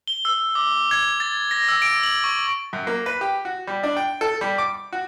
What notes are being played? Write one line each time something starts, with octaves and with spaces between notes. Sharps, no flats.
G7
E6
D6
G#6
A6
A#6
E6
D7
F#7
C#6
F#2
A#3
B4
G4
F#4
G3
D4
G5
A4
G3
D6
F#4